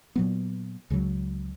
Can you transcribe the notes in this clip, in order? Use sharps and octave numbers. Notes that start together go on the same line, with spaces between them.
A#2 F#3 B3
C#2 C#3 F#3